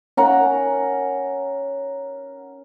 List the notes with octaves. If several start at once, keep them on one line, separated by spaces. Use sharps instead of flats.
C#4 A#4 F#5